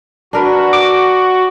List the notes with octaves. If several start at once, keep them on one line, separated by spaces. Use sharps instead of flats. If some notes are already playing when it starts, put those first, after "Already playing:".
D4 F#4 A#4 B4
D6